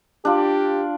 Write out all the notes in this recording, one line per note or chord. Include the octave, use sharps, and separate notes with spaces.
D4 F4 G4